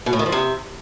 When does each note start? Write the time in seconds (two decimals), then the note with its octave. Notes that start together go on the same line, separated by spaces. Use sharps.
0.06 B2
0.13 A2
0.19 D#3
0.26 F3
0.32 C3